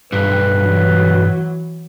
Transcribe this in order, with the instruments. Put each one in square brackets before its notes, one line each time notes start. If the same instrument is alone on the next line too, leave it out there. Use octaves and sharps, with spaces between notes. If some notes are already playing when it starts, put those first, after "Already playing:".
[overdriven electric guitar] B1 G2 [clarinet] B4
[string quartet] E3 F#3